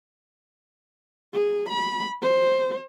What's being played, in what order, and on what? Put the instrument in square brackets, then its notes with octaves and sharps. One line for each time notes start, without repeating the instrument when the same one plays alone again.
[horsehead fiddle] G#4
B5
C5